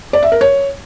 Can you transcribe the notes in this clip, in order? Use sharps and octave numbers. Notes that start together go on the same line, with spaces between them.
D5
E5
A#4
C#5